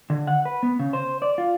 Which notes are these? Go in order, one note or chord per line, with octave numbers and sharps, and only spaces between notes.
D3
F#5
B4
B3
C#3
C5
D5
F4